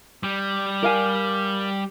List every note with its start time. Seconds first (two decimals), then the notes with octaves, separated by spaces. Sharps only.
0.23 G3
0.83 A#4 F5 G#5